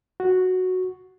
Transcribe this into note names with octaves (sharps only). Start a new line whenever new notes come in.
F#4